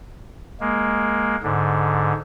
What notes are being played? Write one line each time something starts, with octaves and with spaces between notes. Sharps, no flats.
G#3 A#3
G#2 D3